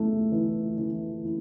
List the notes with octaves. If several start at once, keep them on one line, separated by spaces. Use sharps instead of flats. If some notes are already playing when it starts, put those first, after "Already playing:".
Already playing: A3
E3
E3
E4